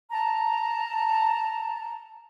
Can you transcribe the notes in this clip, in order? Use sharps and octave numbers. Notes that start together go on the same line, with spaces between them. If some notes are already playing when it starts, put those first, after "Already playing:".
A5 A#5